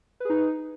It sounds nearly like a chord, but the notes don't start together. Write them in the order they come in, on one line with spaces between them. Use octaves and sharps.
B4 G#4 D#4